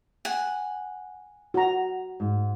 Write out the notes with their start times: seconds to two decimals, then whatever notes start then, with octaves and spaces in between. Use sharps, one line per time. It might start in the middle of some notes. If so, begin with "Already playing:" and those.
0.25 F#5 G#5
1.54 F#4 A#5
2.20 G#2